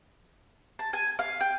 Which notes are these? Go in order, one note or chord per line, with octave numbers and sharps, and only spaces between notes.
A5
G#5
F5
G5